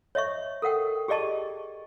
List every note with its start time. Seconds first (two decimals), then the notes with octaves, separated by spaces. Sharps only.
0.15 C#5 D#5 E5 C#6
0.62 A4 A#4 F#5 G5
1.08 G4 G#4 D5 D#5 A5 C#6